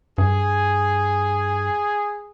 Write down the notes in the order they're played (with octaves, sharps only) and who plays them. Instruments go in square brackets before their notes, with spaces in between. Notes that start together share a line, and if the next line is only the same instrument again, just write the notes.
[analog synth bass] G2 [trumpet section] G#4